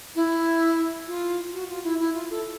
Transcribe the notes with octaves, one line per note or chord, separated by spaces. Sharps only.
E4
F4
F#4
F4
E4
E4
F4
A4